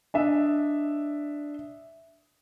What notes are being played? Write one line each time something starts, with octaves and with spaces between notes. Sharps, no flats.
D4 D#5 E5